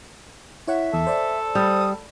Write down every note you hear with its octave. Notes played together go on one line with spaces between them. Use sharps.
E4 C#5 E5 F#5
E2 A4
C5 D5
G3 D#6